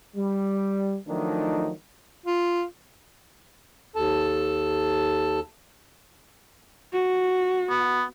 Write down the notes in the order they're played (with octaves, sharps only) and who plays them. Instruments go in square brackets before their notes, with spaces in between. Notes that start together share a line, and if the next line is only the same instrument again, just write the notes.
[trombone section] G3
D#3 F3 F#3 A3 D4 D#4
[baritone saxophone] F4
[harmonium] D#2 A4 A5
[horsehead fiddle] F#4
[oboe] B3